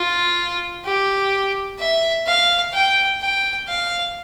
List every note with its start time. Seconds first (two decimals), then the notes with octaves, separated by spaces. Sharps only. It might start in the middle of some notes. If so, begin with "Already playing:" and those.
Already playing: F4
0.85 G4
1.79 E5
2.27 F5
2.73 G5
3.21 G5
3.68 F5